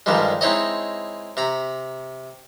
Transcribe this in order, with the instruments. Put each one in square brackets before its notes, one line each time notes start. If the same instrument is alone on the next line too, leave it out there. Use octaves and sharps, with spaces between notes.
[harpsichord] G2 D3 D#3 F3 G3 G#3
G#3 C4 D#4 E4 C#5 D#5
C3 A#5 B5